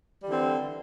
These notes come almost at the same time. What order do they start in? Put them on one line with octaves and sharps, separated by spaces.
G3 E3 D3 C4